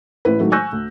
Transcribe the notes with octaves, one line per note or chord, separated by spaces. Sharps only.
A1 E4 B4
D#3 F#3 G#3 A3
G#5 C#6 E6 F#6 G6 A#6
D2